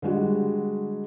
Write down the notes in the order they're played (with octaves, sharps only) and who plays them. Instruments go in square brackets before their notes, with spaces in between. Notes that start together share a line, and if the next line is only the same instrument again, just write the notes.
[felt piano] D3 G3 G#3 F#4